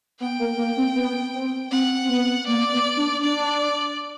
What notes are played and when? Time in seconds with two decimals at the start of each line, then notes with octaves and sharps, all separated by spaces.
0.20 B3 G5
0.39 A#3
0.57 A#3
0.77 C4
0.95 B3
1.34 C4
1.71 C4 F#5
2.04 C4
2.09 B3
2.47 A#3 D5
2.72 B3
2.97 D4
3.22 D4 D5